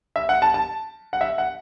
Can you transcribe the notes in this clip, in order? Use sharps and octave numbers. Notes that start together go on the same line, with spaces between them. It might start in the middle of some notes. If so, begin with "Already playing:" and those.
E5
F#5
A5
A5
F#5
E5
F#5